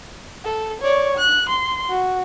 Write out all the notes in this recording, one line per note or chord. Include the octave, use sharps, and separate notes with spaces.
A4
C#5 D5
F#6
C6
F#4